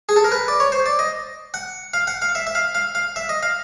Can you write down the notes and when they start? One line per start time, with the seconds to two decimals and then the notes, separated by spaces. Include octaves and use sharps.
0.09 G#4
0.16 A4
0.24 A#4
0.32 B4
0.48 D5
0.60 C#5
0.72 C5
0.86 D5
0.99 D#5
1.54 F#5
1.94 F5
2.07 F#5
2.22 F5
2.35 E5
2.47 E5
2.55 F5
2.75 F5
2.95 F5
3.16 E5
3.29 D#5
3.43 F5